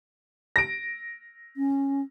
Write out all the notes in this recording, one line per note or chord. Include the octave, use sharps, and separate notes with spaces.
A#6 D7
C#4